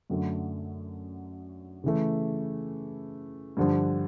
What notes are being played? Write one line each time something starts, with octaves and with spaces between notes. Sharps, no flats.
F#2 D3 F#3 A3
C#3 E3 A3
G2 D3 F3